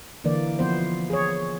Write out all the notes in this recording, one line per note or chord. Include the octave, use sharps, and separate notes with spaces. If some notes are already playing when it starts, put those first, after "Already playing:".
D3 E3 A#3 D5
F3 B3 C5
G#4 C#5